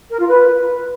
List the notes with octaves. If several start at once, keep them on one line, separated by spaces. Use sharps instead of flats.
A#4
F4
B4